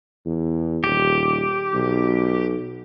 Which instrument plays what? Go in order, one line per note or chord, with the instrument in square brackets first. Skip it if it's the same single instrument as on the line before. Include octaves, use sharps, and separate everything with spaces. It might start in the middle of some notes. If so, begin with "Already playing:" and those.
[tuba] E2
[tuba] D#1 [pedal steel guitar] G4
[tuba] B1